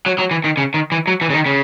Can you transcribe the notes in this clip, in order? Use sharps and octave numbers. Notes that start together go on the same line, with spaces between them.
F#3
F#3
E3
D#3
C#3
D#3
E3
F#3
E3
C#3
D#3
C#3